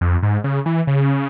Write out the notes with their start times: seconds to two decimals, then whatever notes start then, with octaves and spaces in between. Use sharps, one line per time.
0.01 F2
0.23 G#2
0.44 C#3
0.66 E3
0.87 C#3